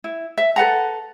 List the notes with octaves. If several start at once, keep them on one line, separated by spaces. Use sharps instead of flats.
E4
E5
A4 B4 F#5 A#5